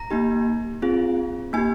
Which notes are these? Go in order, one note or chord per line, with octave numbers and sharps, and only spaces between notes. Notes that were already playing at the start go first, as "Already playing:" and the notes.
Already playing: A#5
A#3 D#4 G4
C4 F4 G#4
A#3 D#4 G4 G#5